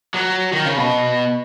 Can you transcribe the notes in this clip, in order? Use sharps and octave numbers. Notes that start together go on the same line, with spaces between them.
F#3
D#3
C#3
B2